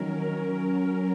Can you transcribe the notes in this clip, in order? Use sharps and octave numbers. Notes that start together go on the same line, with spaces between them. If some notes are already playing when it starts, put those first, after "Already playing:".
Already playing: D#3 F#3 C#4 A#4
F#3 C#4